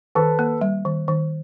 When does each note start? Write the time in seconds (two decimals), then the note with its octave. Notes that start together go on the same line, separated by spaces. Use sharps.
0.15 D#3 A4 B4
0.39 A#3
0.61 G3
0.85 D#3
1.08 D#3